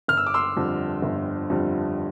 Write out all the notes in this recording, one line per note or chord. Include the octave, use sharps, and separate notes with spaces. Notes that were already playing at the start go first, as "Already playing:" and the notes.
G1 F6
E6
D6
C6 E6
F2 D3 G3
G1
F2 D3 G3